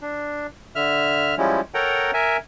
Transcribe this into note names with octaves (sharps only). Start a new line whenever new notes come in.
D4
D3 E5 F6
F3 G3 G#3 C#4 E4
A4 A#4 C#5 F#5 G5 A#5
A#4 E5 G#5